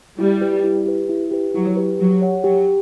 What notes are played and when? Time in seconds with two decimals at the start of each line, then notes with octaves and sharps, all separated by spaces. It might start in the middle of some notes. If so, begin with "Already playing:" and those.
0.19 G3 E4
0.41 G4 B4
0.64 E4
0.86 G4 B4
1.09 E4
1.31 G4 B4
1.54 F#3 E4
1.77 G4 B4
1.99 F#3 G4
2.22 C#5 F#5
2.44 F#3 G4